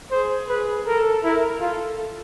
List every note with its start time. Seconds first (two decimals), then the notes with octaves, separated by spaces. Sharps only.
0.11 G#4 C5
0.49 B4
0.86 A4 A#4
1.23 E4 A#4
1.61 F4 A4